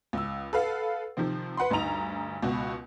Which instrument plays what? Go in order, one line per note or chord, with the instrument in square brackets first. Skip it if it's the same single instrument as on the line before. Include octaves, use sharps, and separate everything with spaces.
[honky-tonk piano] C#2 E6
A4 B4 F5 F#5
C3 D#3 F3 C4
B4 F#5 B5 C6
D2 G2 D#4 A#5 F7
C#2 B2 F#4